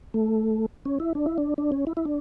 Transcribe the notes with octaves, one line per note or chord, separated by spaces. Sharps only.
A3
C#4
E4
D4
E4
D4
D4
C#4
E4
E4
D4